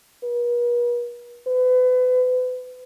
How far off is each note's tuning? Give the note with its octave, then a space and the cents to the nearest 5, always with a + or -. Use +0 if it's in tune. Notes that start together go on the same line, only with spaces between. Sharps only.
B4 -45
B4 +35